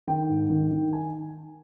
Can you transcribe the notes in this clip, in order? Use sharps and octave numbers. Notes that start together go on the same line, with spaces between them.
D#3 G5
G#2
D#3
D#3
G#5